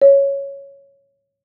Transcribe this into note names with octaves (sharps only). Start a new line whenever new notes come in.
C#5